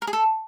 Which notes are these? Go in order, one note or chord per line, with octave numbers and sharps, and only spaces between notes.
A#4
G#4
A4